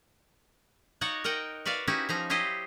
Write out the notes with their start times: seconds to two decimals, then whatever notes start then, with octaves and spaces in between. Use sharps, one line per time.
1.01 D#4 F#4 C#5 D5 F#5 A#5
1.24 A#4 D#5 F#5 G5
1.65 F#4 B4 D5 F5
1.87 C#4 D#4 E4 F#4 G4
2.09 F3 D#4 A#5
2.30 F#3 E4 G4 C5 D#5